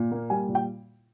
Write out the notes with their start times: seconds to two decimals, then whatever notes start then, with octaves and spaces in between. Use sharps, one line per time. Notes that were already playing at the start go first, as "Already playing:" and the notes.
Already playing: A#2
0.11 A#3
0.30 G3 G#5
0.48 A#2
0.55 G5